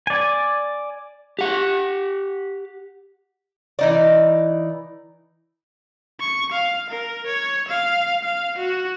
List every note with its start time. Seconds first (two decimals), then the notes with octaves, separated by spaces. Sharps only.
0.07 D5 G#5
1.39 G4 F#5
3.79 E3 D#4 D5
6.20 C#6
6.52 F5
6.90 A#4
7.27 C#5
7.68 F5
8.24 F5
8.58 F#4